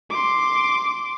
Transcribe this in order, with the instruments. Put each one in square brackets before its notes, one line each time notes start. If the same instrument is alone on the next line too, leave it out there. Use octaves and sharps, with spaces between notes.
[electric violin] C6 D6